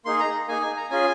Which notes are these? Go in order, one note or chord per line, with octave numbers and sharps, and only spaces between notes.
A#3 D#4 G#4 C6
A#5
A#3 D#4 G#4 G#5
G#5
A#5
C#4 F4 G#4 G#5